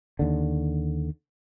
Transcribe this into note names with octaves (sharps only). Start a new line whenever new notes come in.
D#2 D3